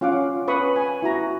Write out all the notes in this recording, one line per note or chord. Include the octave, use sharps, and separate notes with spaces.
C#4 F4 F5 F#5 D6
C#4 B4 B5 C#6 D#6
G#5
E4 F#4 A#5